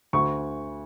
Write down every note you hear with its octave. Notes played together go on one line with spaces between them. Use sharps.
D2 C#6